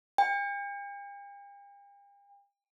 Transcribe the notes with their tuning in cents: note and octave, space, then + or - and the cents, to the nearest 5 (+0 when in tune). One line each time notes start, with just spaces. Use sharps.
G5 +45